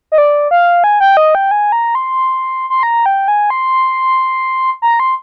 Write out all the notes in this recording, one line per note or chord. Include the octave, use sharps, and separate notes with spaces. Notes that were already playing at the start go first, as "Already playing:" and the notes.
D#5
D5
F5
G#5
G5
D#5
G5
G#5
A#5
C6
C6
A#5
G5
G#5
C6
A#5
C6